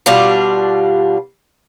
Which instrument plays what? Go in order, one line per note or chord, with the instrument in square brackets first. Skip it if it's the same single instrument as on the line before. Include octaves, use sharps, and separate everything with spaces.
[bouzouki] B2 G3 D4 F4